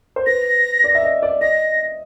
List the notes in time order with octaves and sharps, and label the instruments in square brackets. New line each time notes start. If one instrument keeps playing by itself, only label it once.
[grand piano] C5
[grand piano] B4 [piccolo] A#6
[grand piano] D5
E5
D#5
D5
[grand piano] D#5 [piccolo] A#6